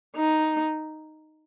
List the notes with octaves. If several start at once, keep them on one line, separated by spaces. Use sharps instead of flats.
D#4